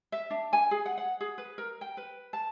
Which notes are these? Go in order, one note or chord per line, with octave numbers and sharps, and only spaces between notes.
E5
D4
G#5
G#4
F#5
F#5
G#4
B4
A#4
G5
B4
A5